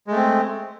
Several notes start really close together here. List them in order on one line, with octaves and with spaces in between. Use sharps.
G#3 A3 C4